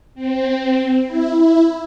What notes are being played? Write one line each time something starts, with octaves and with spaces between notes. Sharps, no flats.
C4
E4
E4